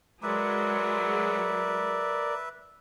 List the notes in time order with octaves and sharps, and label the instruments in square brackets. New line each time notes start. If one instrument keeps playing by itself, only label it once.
[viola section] F#3 G#3 [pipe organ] A#4 D5 [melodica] B4 E5